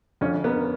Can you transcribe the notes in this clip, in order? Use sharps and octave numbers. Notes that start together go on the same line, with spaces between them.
F2 C#4
A#3 B3